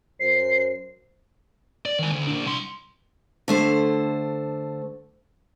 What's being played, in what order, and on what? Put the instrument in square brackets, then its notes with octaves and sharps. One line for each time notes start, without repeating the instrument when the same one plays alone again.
[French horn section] F#2 C5 [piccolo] C7
[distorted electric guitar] D5
D#3 G#5
D2
A#2 D4
C2 C6
[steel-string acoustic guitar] D3 A3 C5